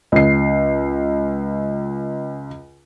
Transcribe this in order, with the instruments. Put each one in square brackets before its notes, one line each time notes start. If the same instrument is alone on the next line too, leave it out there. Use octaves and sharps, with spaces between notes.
[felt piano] C#2 C7